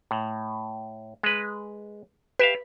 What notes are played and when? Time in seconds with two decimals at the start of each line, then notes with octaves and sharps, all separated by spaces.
0.11 A2
1.23 G#3 B4
2.39 G4 B4 E5 F5